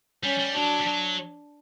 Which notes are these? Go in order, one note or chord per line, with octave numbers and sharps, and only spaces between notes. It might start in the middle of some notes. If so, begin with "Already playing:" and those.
G3 C#4
G3
F#3 D4
G3
F#3